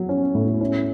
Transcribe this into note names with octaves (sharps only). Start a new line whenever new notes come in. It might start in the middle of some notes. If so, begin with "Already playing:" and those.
Already playing: F#3
C#4
A2
C#4